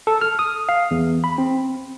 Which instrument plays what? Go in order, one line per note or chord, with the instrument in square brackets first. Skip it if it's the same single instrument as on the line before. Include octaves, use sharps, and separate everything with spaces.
[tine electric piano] A4
F6
D#6
F5
E2
B5
C4